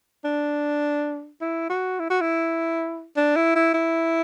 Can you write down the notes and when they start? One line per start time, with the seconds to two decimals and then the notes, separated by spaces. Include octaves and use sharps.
0.25 D4
1.41 E4
1.70 F#4
1.99 E4
2.10 F#4
2.21 E4
3.17 D4
3.36 E4
3.55 E4
3.74 E4